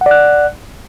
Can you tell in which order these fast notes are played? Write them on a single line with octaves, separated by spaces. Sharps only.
F#5 D5 F#6